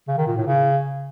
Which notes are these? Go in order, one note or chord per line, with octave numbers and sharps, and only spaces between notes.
C#3
D#3
A#2
A2
C#3